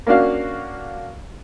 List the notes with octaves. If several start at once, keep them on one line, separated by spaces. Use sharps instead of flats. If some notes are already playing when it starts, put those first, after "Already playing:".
A#3 C#4 D4 F#4 F5